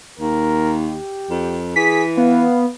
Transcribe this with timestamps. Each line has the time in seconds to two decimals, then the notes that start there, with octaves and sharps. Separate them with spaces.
0.20 D#2 A#4
0.82 G4
1.30 F2
1.76 E3 G#4 B6
2.17 B3 F5